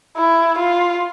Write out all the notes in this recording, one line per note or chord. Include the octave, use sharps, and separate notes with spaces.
E4
F4